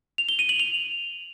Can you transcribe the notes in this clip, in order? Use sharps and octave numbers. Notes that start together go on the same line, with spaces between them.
F7
G7
D#7
F#7
F7